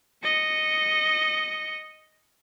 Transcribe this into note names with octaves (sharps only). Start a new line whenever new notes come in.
D#5 C#7